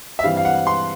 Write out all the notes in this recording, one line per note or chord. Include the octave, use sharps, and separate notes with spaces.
E5
G2 E3 G3 C4 F5
F5
F#5
C6